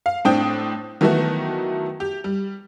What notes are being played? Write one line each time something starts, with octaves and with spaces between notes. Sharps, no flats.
F5
A2 C4 D4 G5 D#6
D#3 E3 F#3 A3 B3 F#4
G4
G3